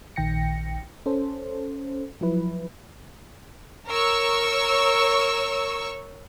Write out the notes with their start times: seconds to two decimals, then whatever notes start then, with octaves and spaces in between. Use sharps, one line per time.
0.16 A#1 D#3 G5 A#6 C#7
1.06 C#4 A4 C5
2.21 F3 F#3 E4 B4
3.87 A#4 C#5 C#6 E6